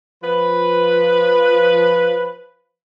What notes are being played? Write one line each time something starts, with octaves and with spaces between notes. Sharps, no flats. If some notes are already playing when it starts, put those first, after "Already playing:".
F3 B4